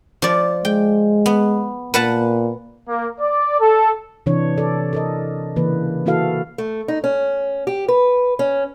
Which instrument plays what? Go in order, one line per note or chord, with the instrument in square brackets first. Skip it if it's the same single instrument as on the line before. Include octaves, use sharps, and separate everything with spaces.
[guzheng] F3 D5
[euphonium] G#3 [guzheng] G5
[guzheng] B3
[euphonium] A#2 [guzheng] B4 F#5 A5
[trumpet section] A#3
D5
A4
[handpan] C3 E3 D4 C#5
A4 D5
A4 A#4 D#5
C#3 E3 A#3 B4
E3 A#3 E4 F#4 A4 F5
[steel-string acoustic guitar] A3
D#4
C#4
G4
B4
C#4